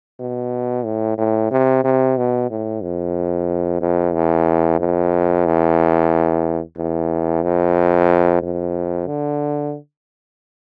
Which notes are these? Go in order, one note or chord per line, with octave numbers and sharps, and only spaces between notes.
B2
A2
A2
C3
C3
B2
A2
F2
F2
E2
F2
E2
E2
F2
F2
D3